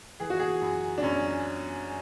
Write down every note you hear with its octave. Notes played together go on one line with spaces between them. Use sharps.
E3 G#4
F#4
G#4
F#2
D4
F#2 C#4